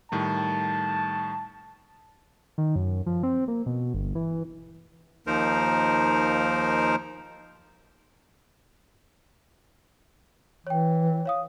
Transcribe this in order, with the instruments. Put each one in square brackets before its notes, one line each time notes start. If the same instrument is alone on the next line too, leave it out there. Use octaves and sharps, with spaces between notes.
[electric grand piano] A2 D#3 G3 [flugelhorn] A5
[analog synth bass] D#3
F#2
F3
C4
A#3
B2
G1
E3
[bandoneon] D#2 F3 D#4 A#4 C5
[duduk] E3 [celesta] C#5 G5
[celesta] C#5 F5 D#6